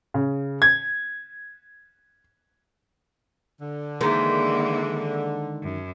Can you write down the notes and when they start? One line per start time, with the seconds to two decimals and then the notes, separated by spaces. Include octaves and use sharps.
0.14 C#3
0.62 G#6
3.60 D3
4.01 D#3 E3 G#3 A#3 A#4
5.63 F#2